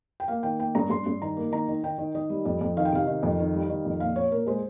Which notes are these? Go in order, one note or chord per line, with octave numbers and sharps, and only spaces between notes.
G5
A#3 F5
D#3 G5
A#3 G5
G2 A#5
G2 C6
G2
D#3 A#5
A#3
D#3 A#5
D#3
D#3 G5
D#3
D#3 D#5
G3
F2
F2
D#3 F5
G5
C3 F5
D#3
F2
D#3
G3
D#3
F2
A#2 F5
A#2 C#5
A#2 A#4
G#3 C5